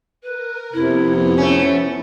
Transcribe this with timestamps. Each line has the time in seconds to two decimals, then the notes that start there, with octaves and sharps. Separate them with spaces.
0.23 A#4 B4
0.73 F2 C3 B3 E4
1.38 A3 C#4 E4